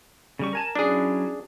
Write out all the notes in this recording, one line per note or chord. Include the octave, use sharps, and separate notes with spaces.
C#3 G3 C#6
A#4 G#5 A5
F#3 C#4 D4 E4 G#4